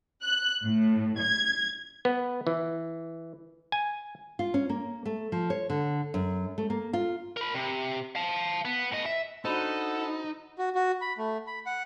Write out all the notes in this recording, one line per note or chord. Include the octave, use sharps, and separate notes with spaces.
F#6
A2
G#6
B3
E3
G#5
F4
C#4
A#3
A3
F3
C#5
D3
F#2
A3
A#3
F4
A#4 B5
C3
F5 A5
B3
A2 D#5
E5
D4 D#4 F#4 A4 C5 F#5 B5
F#4
F#4
B5
A3
B5
F#5